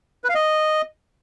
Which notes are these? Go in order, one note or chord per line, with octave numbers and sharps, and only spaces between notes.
B4
F5
D#5